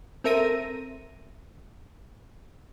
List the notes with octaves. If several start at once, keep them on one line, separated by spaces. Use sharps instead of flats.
C4 A4 A#4 E5 A#6 D#7